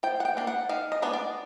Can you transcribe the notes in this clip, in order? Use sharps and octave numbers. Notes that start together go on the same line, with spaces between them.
F3 G5
F#5
G5
A#3 D4
F#5
D#3 F5
D#5
G#3 B3 D4
D5